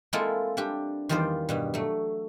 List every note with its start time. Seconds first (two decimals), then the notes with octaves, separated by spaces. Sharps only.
0.13 G#3 A#3 C4 E4 F4 A4
0.57 G3 D4 G4
1.09 E2 D#3 G3 F4 C5 D5
1.49 G2 B2 G3
1.74 F#3 A3